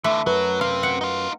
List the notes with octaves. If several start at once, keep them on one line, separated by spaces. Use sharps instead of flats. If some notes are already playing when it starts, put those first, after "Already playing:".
D3 E3 A3
F#2 F#3 B4
C3 F5
F#5
D#4 F4